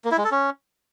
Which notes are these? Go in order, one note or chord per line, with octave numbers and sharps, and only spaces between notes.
A#3
E4
G#3
A4
C#4